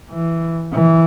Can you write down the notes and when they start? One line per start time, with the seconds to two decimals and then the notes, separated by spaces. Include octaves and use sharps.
0.11 E3
0.72 E3